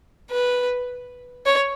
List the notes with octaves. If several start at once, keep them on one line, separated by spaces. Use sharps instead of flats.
B4
C#5